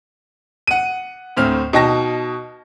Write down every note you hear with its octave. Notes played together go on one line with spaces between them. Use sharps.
F#5 D#7
D2 A2 C4 F6
B2 D#4 G5 A5 A#6